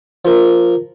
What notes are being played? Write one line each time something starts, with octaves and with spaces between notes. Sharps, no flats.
F3 A#4